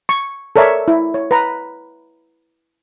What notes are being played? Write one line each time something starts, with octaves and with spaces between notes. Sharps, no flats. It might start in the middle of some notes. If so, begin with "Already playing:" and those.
C#6
A4 A#4 C#5 D5 E5
E4
C#5
B4 A#5